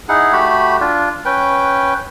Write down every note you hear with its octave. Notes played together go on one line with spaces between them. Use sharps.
D#4 E4 G#4 F#5
A3 F#4 G4 B5
D4 F4
C#4 B4 G5